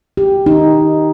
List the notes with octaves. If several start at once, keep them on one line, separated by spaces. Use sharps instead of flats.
G4
D#4